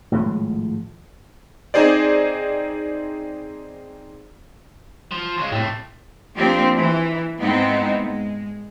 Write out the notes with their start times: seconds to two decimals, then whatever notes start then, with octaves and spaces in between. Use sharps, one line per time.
0.11 G#1 A2 F3 G#3
1.74 C4 D#4 G#4 C5 D5
5.11 F3
5.38 C#3 G#3
5.52 A2 C3 A3
6.35 F3 A#3 C4 D4 G4
6.76 E3
7.39 G#2 B3 C4 D#4 E4
8.00 G#3